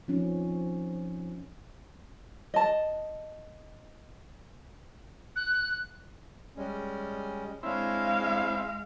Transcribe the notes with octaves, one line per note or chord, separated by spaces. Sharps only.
F3 C4 C#4 D#4
D#5 A5
F#6
G3 G#3 C#4
G#3 C4 D4 E4 C#5 F5